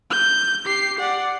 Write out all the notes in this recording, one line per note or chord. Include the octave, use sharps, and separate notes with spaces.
G6
G4 C7
D5 F#5